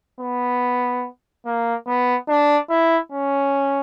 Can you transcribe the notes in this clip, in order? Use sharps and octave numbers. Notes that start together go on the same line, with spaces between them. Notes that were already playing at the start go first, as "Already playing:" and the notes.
B3
A#3
B3
D4
E4
C#4